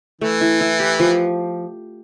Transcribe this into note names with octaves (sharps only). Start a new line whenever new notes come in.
E3 A3
E4
E4
G4
F3